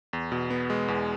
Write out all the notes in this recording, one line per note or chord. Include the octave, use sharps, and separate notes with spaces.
E2
B2
B3
G#3
E2